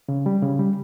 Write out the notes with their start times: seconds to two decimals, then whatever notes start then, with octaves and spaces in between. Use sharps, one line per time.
0.09 C#3
0.26 G3
0.43 C#3
0.59 G3